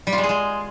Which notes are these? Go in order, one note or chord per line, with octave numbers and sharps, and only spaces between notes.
G3
F4
G#3
G#4
G#3